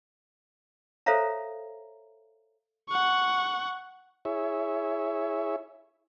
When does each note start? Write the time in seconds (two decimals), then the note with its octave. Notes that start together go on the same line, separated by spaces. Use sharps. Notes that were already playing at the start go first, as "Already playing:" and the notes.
1.06 A4 C5 C#5 E5 F5 A#5
2.89 F#5 C#6
4.25 E4 G#4 C#5 E5